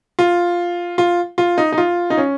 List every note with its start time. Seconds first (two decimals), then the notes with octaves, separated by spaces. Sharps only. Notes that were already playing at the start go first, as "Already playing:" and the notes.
0.19 F4
0.98 F4
1.38 F4
1.58 D#4
1.72 D#4
1.78 F4
2.10 D#4
2.18 C#4